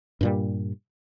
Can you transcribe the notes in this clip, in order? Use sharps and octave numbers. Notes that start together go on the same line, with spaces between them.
G2 A#2 G3